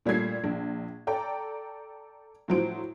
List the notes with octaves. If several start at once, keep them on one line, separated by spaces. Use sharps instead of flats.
A#2 G3 A3 G#6 C7
A#1
A4 D5 G5 A#5
A2 F3 F#3 C5 D7